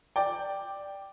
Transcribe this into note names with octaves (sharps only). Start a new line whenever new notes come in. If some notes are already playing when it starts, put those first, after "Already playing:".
D5 G5